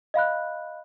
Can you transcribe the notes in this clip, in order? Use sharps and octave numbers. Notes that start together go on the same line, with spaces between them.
D#5 F5 B5 F#6